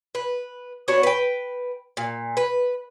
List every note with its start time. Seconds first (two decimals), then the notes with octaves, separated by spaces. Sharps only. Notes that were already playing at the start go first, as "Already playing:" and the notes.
0.15 B4
0.88 B3 D4 F#4 C#5
1.03 B4 G5
1.97 A#2
2.37 B4